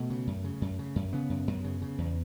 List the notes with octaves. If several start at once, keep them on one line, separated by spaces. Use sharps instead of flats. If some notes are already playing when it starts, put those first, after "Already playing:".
Already playing: B2 A3
C#3
F#2
C#3
F#2
C#3
F#2
C#3 B3
F#2
F#2
C#3
C#3
E2